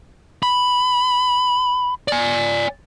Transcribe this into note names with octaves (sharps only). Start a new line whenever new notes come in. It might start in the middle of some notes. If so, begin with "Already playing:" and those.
B5
D5 G#5